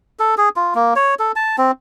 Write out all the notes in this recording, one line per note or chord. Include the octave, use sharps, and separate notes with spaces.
A4
G#4
F4
A#3
C#5
A4
A5
C4